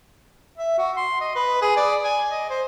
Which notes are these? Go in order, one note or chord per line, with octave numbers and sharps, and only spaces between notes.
E5
F#4
C6
D#5
B4
G#4
D5
G#5
D#5
C5